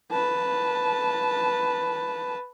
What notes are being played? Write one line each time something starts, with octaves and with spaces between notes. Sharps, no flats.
B4 A5